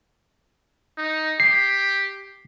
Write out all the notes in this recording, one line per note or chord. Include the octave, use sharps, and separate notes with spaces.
D#4
G4 C7